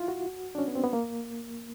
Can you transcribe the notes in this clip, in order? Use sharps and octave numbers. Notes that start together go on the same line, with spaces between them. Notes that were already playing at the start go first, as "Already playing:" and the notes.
Already playing: E4 F4
F#4
D4
C#4
B3
C4
B3
A#3